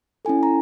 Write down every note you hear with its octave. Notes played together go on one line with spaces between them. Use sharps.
C#4 E4 A4 G#5
A#5